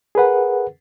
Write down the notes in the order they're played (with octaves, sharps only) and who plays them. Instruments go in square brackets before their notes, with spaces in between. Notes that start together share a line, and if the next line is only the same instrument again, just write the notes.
[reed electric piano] G#4 A#4 B4 F#5